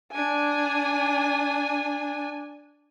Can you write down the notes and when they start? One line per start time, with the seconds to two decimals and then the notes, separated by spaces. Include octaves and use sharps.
0.12 D4 G#5